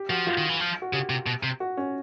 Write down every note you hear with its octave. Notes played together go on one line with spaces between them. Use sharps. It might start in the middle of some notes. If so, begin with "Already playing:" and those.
Already playing: G4
F3 F#4
F4
D#3
E3
F3
F#4
C#3 G4
C3
B2
C3
F#4
C#4